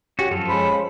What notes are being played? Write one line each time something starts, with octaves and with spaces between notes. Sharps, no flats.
C#4 F#4 G4
F#2 F3 F4 A4
G#3 C#4 C5 B5